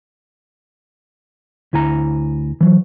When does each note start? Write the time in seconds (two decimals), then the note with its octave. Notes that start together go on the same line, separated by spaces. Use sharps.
1.73 D2 E4 G#5 A#5
2.61 E3 F#3